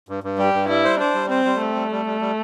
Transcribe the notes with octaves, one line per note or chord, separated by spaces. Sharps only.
G2
G2
G3 G4
G2
G3 E4
C5
D4 C5
G3
C4 C5
G3
A3 C4
G3
G3
G3
G3